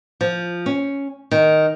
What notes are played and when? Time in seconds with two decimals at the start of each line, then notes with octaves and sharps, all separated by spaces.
0.21 F3
0.66 C#4
1.31 D#3